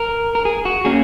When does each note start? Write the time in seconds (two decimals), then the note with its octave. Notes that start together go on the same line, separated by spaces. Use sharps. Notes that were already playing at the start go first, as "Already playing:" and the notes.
Already playing: A#4
0.35 A#4
0.45 G#4
0.65 F#4
0.85 F#3 A#3 C#4 G#4